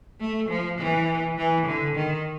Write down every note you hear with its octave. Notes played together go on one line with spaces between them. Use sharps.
A3
F3
E3
E3
D3
D#3